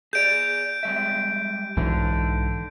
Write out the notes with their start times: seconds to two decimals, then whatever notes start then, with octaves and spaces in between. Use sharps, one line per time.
0.13 G#4 D5 G6 D7
0.83 G3 G#3 E5
1.77 B1 G#2 D3 E3